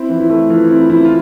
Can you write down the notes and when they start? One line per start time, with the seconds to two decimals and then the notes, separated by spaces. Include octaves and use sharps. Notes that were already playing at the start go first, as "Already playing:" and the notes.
Already playing: C4 E4
0.09 E3
0.20 E4
0.29 A3
0.50 E3 F4
0.69 C4 E4
0.90 E3 E4
1.05 F4